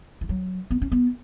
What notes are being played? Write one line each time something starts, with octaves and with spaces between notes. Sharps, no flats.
E3
F#3
B3
C#4
B3